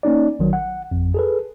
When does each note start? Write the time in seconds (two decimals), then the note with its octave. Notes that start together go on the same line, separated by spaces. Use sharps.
0.03 A#3 C#4 D#4 D5
0.39 A1 D#3 F#3
0.53 F#5
0.91 G#1 F2
1.14 G#4 A4 B4